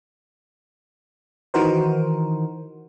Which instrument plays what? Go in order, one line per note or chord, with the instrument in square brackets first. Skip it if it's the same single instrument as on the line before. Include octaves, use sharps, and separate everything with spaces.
[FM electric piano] D#3 E3 D#4 F#4 A#4 C5